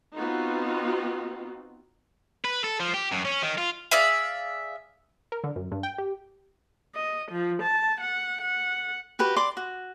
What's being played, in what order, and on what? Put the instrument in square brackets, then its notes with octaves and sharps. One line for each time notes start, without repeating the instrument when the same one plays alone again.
[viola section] B3 C4 D#4 F4 F#4
[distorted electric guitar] B4
A4
F3
G4
F#2
C#4
D#3
F4
[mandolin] G#4 D5 E5 F5
[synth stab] A#4
D3
F#2
G2
G5
G4
[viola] D#5
F3
A5
F#5
F#5
[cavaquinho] F#4 G4 B4 G5
D5 C6 D6
F#4